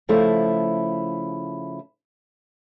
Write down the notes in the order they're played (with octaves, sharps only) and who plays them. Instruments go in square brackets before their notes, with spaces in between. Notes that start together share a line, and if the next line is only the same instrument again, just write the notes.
[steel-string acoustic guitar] C#3 F3 A3 E4